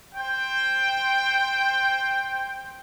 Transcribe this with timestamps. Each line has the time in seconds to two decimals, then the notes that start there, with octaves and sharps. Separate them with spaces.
0.15 C5 G5